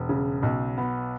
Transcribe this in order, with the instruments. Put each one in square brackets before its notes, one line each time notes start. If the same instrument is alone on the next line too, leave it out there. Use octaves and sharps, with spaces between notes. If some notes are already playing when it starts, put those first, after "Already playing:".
Already playing: [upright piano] E1
C#3
B1
B3